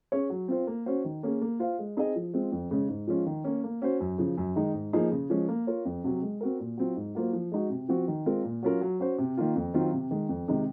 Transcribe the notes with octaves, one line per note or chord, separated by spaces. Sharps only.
C#4 G#4 C#5
F#3
C4 F4 C5
A#3
C#4 F#4 C5
D#3
A#3 C#4 G#4
A#3
F4 C5 F5
G#3
C4 D#4 G#4 D#5
F3
G#3 C4 F4
F2
C#3 G#3 C#4
G#2
F3 G#3 C#4 F4
D#3
A#3 C#4
A#3
C#4 F#4 C5
F#2
C#3 F3
F#2
D#3 G#3 D#4
G#2
F3 A#3 D#4 G#4
C#3
F3 G#3 C#4
A#3
F4 A#4 C#5
F2
C3 F#3
G#3
C4 F#4 A#4
A#2
F#3 C4 F4
G#2
F#3 A#3 F4 C5
F3
G#3 D#4 F#4
C3
F3 C4 F#4
D#3
G#3 C4 F4 A#4
A#2
F#3 C#4 F4 A#4
F#3
C#4 F#4 C5
C3
D#3 A#3 F4
F2
D#3 F#3 C4 F4
C3
D#3 G#3
F2
C3 D#3 G#3 D#4